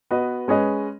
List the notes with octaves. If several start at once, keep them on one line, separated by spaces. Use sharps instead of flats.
B3 F#4 B4 D#5
G#3 C#4 G#4 B4 D#5